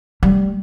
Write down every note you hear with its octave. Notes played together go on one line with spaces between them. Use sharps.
G3